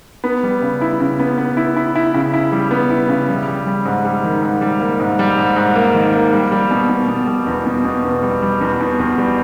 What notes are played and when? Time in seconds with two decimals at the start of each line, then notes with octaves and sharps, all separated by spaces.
0.24 B3
0.43 G3
0.62 C#3
0.81 E4
1.00 C#3
1.19 B3
1.38 B3
1.57 E4
1.76 E4
1.95 E4
2.14 C#3
2.33 E4
2.52 G3
2.71 B3
2.90 E4
3.09 C#3
3.29 G3
3.48 G3
3.66 G3
3.85 G#2
4.05 G3
4.24 D#3
4.42 G#2
4.61 G3
4.80 A#3
4.99 G#2
5.19 G3
5.38 G#2
5.56 G#2
5.75 A#3
5.94 D#3
6.14 A#3
6.33 G3
6.52 G3
6.71 B2
6.89 B2
7.08 B2
7.27 G3
7.47 E2
7.66 B2
7.85 B2
8.04 E2
8.23 G3
8.42 G3
8.61 E2
8.80 B2
8.99 E2
9.18 G3